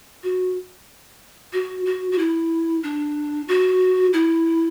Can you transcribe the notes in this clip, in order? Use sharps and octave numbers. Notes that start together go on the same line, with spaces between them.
F#4
F#4
F#4
F#4
E4
D4
F#4
E4